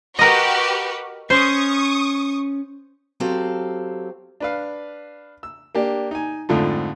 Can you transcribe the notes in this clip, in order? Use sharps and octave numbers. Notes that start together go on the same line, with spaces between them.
F#4 G4 A#4 B4 D#5
C#4 C5 C#6 D#6
F#3 C4 G4 A4 F5
D4 B4 F5
E6
A#3 D4 G4
D#4 G#5
F2 G#2 D3 F3 A3